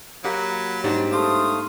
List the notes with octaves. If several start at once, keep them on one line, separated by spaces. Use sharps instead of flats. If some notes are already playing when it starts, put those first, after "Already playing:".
F#3 A#3 G4 F#5 B5
G#2 G3 D4 F#5
A3 C5 F5 D#6